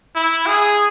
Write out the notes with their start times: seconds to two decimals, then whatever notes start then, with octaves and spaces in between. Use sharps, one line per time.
0.16 E4
0.46 G#4